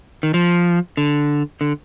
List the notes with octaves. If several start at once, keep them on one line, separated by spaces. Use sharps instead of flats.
D#3
F3
D3
D3